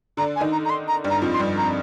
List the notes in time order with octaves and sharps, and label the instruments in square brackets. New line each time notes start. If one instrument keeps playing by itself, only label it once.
[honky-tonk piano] D3 D4 [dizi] A#5
[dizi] G#5
[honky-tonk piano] D#3 D#4
[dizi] A#5
A#5
C6
A#5
[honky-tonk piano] G2 G3
[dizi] A#5
[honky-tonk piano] F2 F3
[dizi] C6
[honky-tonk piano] G2 G3
[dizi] A#5